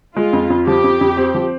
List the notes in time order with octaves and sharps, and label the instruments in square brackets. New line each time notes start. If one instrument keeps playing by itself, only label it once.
[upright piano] G#3 [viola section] F4
[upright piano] F2
F2
[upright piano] F3 [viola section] G4
[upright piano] F2
F2
C4
F3